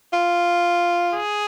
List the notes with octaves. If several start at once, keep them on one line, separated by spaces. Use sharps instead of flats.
F4
G#4